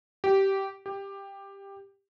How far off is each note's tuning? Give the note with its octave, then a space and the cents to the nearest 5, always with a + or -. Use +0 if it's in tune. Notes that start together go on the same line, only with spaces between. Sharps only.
G4 -15
G4 +10